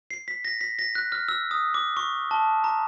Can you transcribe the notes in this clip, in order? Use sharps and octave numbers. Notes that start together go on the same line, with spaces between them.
C7
B6
A#6
B6
A#6
F#6
F6
E6
D#6
D6
C#6
A5
A#5